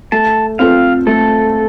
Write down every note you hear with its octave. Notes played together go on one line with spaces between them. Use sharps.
A3 A5
C4 F4 A4 F5
A3 A4